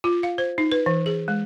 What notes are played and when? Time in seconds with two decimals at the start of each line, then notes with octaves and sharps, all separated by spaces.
0.04 F4
0.23 F5
0.38 C5
0.58 D#4
0.72 B4
0.86 E3
1.06 G#4
1.28 G#3